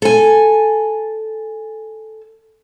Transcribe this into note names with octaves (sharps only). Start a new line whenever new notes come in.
A4 G#5